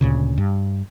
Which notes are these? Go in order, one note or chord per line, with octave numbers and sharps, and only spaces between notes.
D2 A#2 C#3
G2